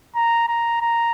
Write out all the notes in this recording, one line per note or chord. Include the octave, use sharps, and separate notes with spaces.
A#5
A#5
A#5